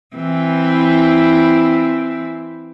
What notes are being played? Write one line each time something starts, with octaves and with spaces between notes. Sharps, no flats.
E3 C4 E4